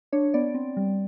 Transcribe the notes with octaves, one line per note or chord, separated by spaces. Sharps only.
D4 C#5
B3 D5
C4
G3